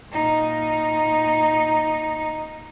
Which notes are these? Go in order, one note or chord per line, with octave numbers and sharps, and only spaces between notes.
A#2 D#4